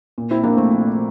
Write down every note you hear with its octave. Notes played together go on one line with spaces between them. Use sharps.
A#2
C4 E4
A#1 A#3 D4
A3 C4
F3